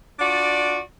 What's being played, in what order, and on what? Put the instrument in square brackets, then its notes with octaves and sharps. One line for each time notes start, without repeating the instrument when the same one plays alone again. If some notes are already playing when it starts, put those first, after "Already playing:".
[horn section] D4 F4 F#4 D5